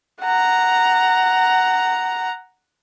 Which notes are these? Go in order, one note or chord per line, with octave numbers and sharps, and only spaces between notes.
F#5 A#5